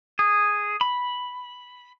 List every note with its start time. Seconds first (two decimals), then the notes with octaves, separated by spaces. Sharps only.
0.19 G#4
0.81 B5